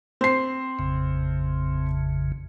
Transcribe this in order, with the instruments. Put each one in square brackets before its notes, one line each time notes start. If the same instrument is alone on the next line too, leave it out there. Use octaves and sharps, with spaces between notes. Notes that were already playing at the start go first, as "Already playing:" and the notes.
[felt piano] C4 C7
[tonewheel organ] A1 F2 C#3